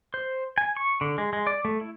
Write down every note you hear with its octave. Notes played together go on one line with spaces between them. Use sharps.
C5
G#5
C#6
D3
G#3
G#3
D5
A3
E4